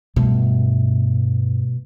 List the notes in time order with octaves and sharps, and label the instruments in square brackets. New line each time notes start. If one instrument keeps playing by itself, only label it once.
[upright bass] G2 [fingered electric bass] B2 A3